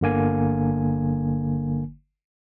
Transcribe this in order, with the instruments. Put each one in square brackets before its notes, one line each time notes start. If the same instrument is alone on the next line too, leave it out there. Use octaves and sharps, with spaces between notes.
[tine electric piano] G1 D3 A#3 G#5